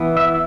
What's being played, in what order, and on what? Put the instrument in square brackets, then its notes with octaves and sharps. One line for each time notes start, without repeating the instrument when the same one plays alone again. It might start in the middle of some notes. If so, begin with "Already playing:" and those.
Already playing: [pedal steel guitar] E3 B3
E5